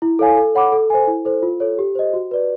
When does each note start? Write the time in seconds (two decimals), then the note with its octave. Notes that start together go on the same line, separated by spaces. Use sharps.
0.02 E4
0.19 A4 C#5 F5 G#5
0.37 A4
0.55 C#5 F#5 B5 D6
0.72 A4
0.90 C5 E5 G#5
1.07 E4
1.25 A4 C5
1.43 F4
1.60 A4 C#5
1.79 G4
1.95 C5 D#5
2.14 F#4
2.31 B4 D5